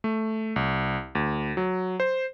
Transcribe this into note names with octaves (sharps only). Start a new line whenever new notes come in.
A3
C2
D2
F#3
C5